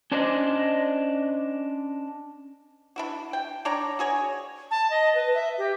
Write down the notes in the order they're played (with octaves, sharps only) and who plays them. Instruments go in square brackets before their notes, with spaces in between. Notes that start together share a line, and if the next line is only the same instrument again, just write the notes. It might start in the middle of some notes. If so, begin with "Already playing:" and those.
[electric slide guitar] C#4 D4 C5 D5 D#5
[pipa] D4 E4 F#4
G5
D4 C#5 D5 A#5
F#4 G#4 C#5
[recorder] A5
D#5
B4
E5
G4